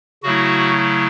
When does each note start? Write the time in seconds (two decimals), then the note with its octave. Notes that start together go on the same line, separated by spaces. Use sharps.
0.23 C#3 F#3 A3 E4 F#4